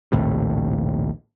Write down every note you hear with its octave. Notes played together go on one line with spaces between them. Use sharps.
A#1 D#2 A2 C3